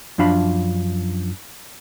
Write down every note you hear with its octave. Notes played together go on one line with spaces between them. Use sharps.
F#2 F3 D4 F5 B5